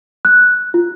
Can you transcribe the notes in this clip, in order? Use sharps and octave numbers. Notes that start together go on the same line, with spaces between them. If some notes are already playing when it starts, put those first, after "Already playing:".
F#6
F4